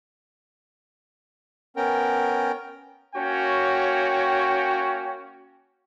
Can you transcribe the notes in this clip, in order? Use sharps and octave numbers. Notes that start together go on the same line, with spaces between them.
B3 C#4 A#4 G5
A#3 C#4 F#4 C#5 G5